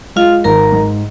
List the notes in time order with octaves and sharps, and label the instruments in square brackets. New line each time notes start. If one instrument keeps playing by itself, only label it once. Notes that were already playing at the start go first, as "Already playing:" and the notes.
[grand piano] G#3 [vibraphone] F4 F5
[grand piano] G#1 [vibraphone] A#4 A#5
[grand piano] G#2